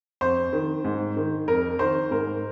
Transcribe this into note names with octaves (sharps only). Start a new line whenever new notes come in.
F2 C5
D#3
G#2
D#3
F2 A#4
D#3 C5
G#2 A#4